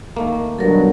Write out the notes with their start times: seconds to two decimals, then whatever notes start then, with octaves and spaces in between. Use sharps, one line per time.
0.16 D#3 A3 A#3
0.59 G2 B2 F#3 A4 A#4